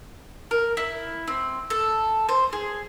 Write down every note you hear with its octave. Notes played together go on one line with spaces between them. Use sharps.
A#4
E4
C4
A4
C5
G#4